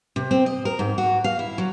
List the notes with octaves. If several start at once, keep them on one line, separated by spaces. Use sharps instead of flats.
C3
C4
D#5
A#4
G#2
F#4
F5
E4
F#3